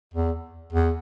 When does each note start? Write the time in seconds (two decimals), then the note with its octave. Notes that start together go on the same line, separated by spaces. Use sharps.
0.14 E2
0.73 E2